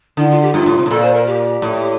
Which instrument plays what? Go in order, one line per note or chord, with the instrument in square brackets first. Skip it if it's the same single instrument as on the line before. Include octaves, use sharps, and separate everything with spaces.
[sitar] D3 [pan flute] E4
[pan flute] F4
G4
[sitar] G2 [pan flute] F4
[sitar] A2
C3
A2
[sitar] A#2 [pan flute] A4
[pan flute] C5
A#4
G4
[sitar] A2